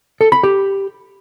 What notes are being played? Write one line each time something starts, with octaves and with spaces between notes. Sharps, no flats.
A4
B5
G4